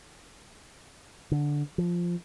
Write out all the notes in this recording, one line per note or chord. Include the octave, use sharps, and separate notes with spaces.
D3
F3